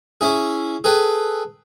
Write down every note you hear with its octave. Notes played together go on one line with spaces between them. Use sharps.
C#4 E4 G#4
G#4 A4 B4 G5